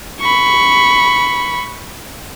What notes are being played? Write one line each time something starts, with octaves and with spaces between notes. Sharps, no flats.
B5 C#6